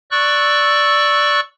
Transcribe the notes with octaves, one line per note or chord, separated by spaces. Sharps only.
D5 C#6 E6 F#6